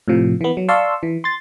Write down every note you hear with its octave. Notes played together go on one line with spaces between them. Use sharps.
A2 C3 F3
E3 B3
F#3
D5 F5 A5 C6 C#6 E6
E3
C6 A6